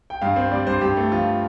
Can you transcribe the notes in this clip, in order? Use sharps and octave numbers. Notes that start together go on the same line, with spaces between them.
G5
G2 F5
C4
G3 D5
G2 C5
G2 G4
A3
F3 F4